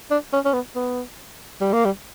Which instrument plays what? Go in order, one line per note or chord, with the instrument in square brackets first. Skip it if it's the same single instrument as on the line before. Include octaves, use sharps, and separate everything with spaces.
[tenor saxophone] D4
C#4
C#4
B3
B3
G3
A#3
G3